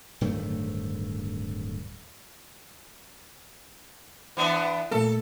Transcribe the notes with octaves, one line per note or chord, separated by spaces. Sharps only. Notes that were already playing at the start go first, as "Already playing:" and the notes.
D1 G2 D#3 A3
E3 B3 D4
A#2 A3 A#3 A4